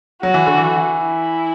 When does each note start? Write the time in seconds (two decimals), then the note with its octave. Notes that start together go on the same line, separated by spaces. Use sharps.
0.23 F#3 F#4
0.34 E3
0.46 D3
0.57 E3
1.02 E4